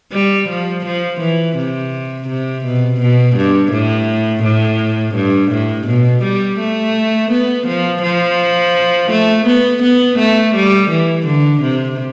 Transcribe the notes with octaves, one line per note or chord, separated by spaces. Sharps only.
G3
F3
F3
E3
C3
C3
B2
B2
G2
A2
A2
G2
A2
B2
G3
A3
B3
F3
F3
A3
B3
B3
A3
G3
E3
D3
C3